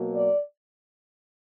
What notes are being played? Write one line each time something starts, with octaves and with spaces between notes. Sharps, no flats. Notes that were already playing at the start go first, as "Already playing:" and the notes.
Already playing: B2 F#3 A#3
D5